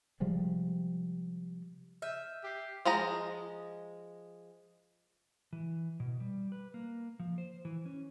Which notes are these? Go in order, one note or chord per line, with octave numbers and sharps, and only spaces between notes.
C3 F3 G3 G#3
E5 F6 G6 D#7
G4 B6 C7
F3 G#3 D#5 A#5
E3
B2
G3
B4
A#3
F3
C5
E3
C#4